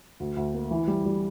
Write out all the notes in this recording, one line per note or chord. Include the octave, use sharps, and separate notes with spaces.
D2
D2
A#3
E3
G3
G3